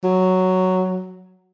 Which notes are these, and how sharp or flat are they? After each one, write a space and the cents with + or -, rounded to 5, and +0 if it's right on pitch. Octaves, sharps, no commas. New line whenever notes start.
F#3 +5